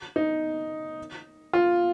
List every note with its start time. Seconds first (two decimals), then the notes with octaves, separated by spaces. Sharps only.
0.16 D#4
1.53 F4